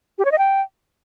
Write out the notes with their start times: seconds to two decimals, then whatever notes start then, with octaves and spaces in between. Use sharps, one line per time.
0.18 G4
0.25 C#5
0.32 D#5
0.38 G5